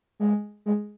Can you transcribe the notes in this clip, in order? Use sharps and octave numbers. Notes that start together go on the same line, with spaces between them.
G#3
G#3